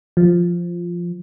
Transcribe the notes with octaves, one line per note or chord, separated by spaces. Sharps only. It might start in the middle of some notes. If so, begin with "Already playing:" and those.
F3